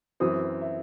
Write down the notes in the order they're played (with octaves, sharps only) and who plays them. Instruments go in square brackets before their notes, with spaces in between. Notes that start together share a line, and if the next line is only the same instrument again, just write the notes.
[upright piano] F#2 E3 C4 D#6
E5